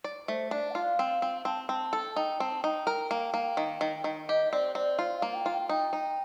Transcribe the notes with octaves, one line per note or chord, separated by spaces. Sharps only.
D5
A3 C5
D4 D5
G5
F4 F5
C4
C4
C4 A5
C4 A5
A4
D#4 G5
C4 A5
D#4 G5
A#4
A#3
A#3
D#3
D#3
D#3
G4 D#5
C4 D5
C4 D5
F4
F5
A#3
G5
F4
G5
D#4 G5
D#4